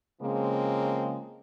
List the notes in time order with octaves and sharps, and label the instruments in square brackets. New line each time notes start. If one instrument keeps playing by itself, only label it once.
[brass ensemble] C#3 F3 G#3 A#3 C4